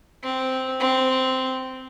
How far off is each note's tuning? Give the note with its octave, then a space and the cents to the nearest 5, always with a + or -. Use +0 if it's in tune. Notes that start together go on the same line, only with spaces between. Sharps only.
C4 -5
C4 -10